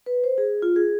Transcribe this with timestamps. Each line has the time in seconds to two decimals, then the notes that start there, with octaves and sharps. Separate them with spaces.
0.06 B4
0.24 C5
0.38 G#4
0.62 F4
0.76 G#4